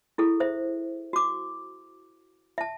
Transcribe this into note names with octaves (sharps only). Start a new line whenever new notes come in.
E4 G#4 A4
C5 E5
F#4 D6
E5 A5